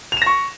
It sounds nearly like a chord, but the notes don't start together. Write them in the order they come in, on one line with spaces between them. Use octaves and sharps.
F7 E7 A#6 C#6